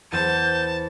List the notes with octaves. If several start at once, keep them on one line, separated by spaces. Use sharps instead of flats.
E2 C5 A5 G6